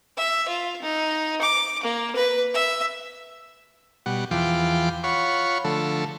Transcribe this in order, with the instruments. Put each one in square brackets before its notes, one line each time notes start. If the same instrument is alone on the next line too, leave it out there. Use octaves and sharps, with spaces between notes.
[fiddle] E5
F4
D#4
D6
A#3
B4
E5
[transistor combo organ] B2 G3 F#5
E2 E3 F3 F4 G5 D6
F4 C#5 F#5 B5 C#6
D3 F3 A3 A4